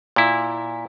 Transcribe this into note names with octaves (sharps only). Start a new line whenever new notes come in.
A#2 E4